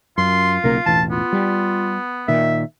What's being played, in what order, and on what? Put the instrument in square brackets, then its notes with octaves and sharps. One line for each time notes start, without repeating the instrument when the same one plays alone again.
[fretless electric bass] F#2 [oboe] F4 [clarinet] C6
[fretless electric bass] B1 C#3 A#3 [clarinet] A#4
[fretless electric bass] E1 A1 E3 [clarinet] A5
[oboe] B3 [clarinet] F4
[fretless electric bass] G3
[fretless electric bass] A#2 D#3 [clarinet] E5